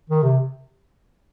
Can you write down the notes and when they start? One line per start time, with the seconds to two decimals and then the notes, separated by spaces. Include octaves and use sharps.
0.10 D#3
0.22 C3